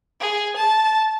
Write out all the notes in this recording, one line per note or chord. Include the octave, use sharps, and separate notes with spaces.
G#4
A5